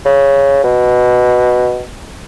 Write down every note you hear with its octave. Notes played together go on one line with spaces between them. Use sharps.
C#3
B2